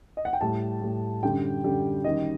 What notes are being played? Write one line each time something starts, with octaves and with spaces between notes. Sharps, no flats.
D#5
F#5
G5
A2 G3 A5
A2 G3
F#2 D3 G3 G5
F#2 D3 G3
F#2 D#3 G3 D#5